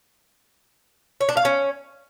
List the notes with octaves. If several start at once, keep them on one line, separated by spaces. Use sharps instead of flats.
C#5
D4
F5
C#4